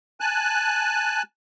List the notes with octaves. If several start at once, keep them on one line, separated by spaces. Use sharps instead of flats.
G#5 A5 F#6